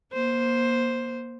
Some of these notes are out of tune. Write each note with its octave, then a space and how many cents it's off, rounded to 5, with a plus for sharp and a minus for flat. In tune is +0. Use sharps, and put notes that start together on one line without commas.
A#3 +25 C5 +0